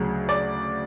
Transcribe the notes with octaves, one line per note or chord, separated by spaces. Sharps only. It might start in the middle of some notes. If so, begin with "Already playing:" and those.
Already playing: D2 C#3 F#3
D5